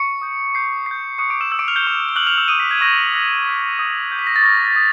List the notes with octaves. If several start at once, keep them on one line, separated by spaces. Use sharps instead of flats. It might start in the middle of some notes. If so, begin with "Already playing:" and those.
Already playing: C#6 C#7
D#6 G6
D6 G6 C7
D6 G6 C7
C#6 D#6 F#6 C#7
D6 D7
E6 E7
D#6 E6 G6 E7
D6 D7
F6 F7
G6 G7
C#6 F6
G7
D6 F6 F#6 F#7
F6 F7
E6 E7
C#6 D#6 F6 D#7
B6
G#6
C#6 E6 G6 A#6
D6 F#6 A#6
D#6 F#6 B6
D#6 G6
D6 G6
B6
A#6
A6
C#6 F6 A#6
D#6